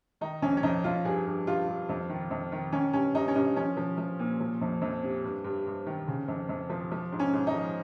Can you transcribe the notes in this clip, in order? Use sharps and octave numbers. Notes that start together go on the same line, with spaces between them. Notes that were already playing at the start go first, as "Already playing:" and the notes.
D#3 D#4
F2 C#4
C#4
F2 D#4
F2 F4
G2 G#4
G2
G2 F4
G2
F2
D#3
F2
D#3
D#3 C#4
G2 C#4
G2 D#4
C#4
G2 D#4
F3 C#4
F3
F3
A#2
F3
F2
F2
C3
G2
G2
G2
D#3
C#3
F2
F2
F3
F3
G#2
C#4
G#2
D#4
F3